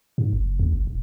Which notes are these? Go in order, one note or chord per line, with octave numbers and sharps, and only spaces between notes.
G#2
F#1
D#2
F#1
D#1